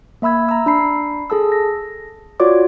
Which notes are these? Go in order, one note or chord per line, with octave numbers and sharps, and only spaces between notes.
A#3 E5 B5 E6 G#6
A#5 E6
D4 B5 C7
G#4 A4 A5 E6
A#6
F4 F#4 C#5 D5 D6